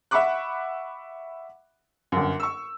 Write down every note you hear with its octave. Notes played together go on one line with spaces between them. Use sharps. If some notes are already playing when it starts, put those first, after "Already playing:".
E5 F#5 B5 C#6 D6 F#6
G1 F#2
C#6 E6